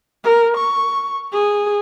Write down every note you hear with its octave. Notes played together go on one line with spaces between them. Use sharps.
A#4
C#6
G#4